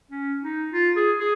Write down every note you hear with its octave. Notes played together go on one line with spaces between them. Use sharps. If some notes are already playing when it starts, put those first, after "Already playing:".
C#4
D#4
F4
G#4
G#4